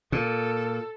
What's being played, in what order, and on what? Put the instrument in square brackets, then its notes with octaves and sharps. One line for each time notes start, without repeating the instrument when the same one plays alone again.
[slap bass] A#2 [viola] A4